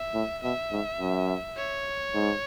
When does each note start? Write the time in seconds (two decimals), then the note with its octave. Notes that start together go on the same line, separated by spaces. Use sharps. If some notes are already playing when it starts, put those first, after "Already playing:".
Already playing: E5
0.14 A2
0.43 B2 E5
0.72 G#2
1.00 F#2
1.57 C#5
2.14 G#2